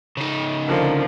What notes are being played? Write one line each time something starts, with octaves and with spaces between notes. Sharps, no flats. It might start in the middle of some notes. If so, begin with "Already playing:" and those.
C#3 D#4
D3 F3 A#3